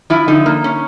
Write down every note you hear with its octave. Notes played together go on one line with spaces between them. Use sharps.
F3 E4
D3 D#4
A#3
C#4